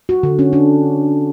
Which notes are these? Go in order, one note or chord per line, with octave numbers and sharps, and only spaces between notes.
F#4
D3
C#4
D4